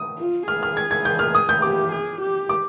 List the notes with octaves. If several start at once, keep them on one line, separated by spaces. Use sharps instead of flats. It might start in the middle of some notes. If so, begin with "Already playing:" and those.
Already playing: D#6
F4
G#4 F6
F6
G#6
G#6
G6
F6
D#6
G6
G4 D6
G#4
G4
D6